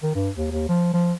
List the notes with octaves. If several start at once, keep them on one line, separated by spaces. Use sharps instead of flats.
D#3
G2
D#2
D#2
F3
F3